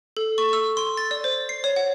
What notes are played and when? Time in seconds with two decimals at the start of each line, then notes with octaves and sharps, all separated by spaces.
0.17 A4
0.38 C#6
0.53 E6
0.77 C6
0.97 A6
1.11 D5
1.24 C5
1.49 C7
1.64 C#5
1.76 F#5